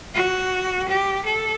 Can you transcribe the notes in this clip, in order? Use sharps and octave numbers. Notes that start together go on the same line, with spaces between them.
F#4
G4
A4